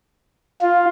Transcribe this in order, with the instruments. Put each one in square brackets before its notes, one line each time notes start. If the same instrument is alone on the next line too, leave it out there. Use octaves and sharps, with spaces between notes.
[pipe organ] F4